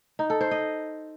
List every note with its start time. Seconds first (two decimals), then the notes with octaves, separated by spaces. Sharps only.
0.19 D#4
0.30 A4
0.41 C5
0.51 D#5